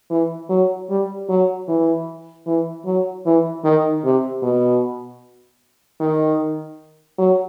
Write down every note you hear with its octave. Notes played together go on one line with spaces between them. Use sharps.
E3
F#3
G3
F#3
E3
E3
F#3
E3
D#3
C3
B2
D#3
F#3